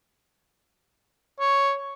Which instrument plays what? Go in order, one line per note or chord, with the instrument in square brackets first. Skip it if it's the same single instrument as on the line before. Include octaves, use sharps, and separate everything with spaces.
[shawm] C#5